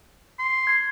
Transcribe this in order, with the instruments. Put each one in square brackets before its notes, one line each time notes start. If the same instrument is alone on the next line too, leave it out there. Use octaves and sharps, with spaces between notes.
[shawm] C6
[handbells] G#6 C7